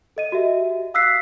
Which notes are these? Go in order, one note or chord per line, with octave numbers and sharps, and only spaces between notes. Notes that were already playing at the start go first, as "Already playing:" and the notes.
A4 D#5 D#7
F#4 G4 E5
F5 D#6 E6 F#6 B6 C7